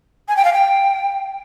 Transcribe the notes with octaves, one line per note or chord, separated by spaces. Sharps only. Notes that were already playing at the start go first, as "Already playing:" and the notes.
G#5
G5
F5
G5